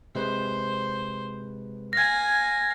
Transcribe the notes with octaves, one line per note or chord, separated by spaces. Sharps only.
C3 G#3 B4 C5
F5 G#5 G#6 A#6